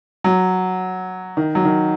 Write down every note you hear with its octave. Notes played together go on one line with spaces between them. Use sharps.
F#3
D#3
F#3
D#3